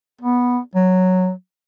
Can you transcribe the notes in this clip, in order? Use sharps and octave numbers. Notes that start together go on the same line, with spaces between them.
B3
F#3